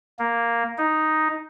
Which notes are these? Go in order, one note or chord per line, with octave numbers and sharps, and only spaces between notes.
A#3
D#4